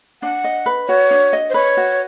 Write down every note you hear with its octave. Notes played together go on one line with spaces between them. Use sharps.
D4 F#5
D#5
B4
F#4 C#5
D4
D#5
C5
B4 C#5
F#4